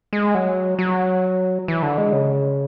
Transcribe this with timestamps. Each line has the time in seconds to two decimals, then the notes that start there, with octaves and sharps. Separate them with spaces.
0.13 G#3
0.35 F#3
0.79 F#3
1.68 E3
1.82 D3
1.98 G#3
2.13 C#3